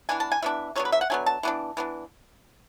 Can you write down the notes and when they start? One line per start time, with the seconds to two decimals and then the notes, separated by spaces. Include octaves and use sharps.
0.09 E3 B3 D4 G#5
0.20 A5
0.32 G#5
0.42 E3 B3 D4 E5
0.75 D3 F#3 B3 C#5
0.85 B4
0.92 E5
1.01 F#5
1.10 D3 F#3 B3 G#5
1.26 A5
1.43 E3 B3 D4
1.77 E3 B3 D4